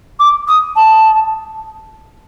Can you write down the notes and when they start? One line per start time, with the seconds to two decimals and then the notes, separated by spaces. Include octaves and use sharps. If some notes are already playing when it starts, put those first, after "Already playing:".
0.19 D6
0.47 D#6
0.76 A5